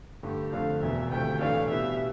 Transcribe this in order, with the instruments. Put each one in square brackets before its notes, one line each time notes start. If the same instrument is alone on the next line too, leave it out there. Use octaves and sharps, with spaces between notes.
[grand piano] G2 D3 A3 [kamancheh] G4
[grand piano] F2 D3 F3 A3 [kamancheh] F5
[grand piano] E1 E2 B2 [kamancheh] E5
[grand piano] D2 C3 F3 A3 [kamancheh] G5
[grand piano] B1 A2 E3 A3 D4 [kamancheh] F5
[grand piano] B2 G3 B3 E4 [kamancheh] E5